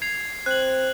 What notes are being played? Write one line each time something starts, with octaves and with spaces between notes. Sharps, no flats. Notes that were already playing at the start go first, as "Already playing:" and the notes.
G#6 C7 F7
C4 F#6 F#7